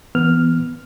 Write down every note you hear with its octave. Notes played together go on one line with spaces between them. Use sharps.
E3 B3 F6